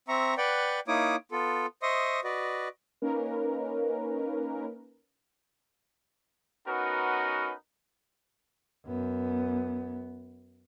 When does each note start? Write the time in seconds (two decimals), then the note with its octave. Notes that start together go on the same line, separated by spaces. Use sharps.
0.08 C4 E5 A#5 C#6
0.37 B4 D5 F#5 G5
0.88 A#3 D#4 E4 C#5 D6 D#6
1.32 B3 F4 A4
1.82 C5 D#5 E5 C6 C#6 D#6
2.24 F#4 B4 D5 D#5
3.02 A#3 C#4 D#4 A#4 B4
6.67 B3 C#4 D#4 F#4 A#4 B4
8.86 F#2 B3